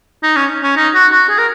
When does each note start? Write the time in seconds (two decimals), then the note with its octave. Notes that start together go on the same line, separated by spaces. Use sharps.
0.23 D#4
0.36 C#4
0.63 C#4
0.77 D#4
0.95 F#4
1.12 F#4
1.29 G#4
1.38 A#4